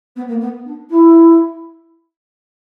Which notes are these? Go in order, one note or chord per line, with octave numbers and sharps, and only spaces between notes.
B3
A#3
B3
D4
E4